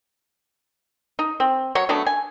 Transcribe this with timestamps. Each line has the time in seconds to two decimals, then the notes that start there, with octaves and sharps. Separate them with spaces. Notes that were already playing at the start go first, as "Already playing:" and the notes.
1.19 D#4
1.40 C4
1.75 F#3 C#5
1.89 F#3 A3 B3 D4
2.06 G#5